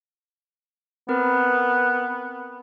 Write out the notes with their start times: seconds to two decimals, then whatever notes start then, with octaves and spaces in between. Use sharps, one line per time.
1.09 B3 C4 A#4